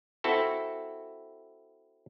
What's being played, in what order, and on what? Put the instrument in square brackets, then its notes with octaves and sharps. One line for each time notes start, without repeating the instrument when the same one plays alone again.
[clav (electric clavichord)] C4 E4 F#4 A4